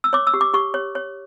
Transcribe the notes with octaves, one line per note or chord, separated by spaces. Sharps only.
E6
C#5 D6
E6
G4
D6
G4 C#6
C#5
C#5